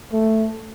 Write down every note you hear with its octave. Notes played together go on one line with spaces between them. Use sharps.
A3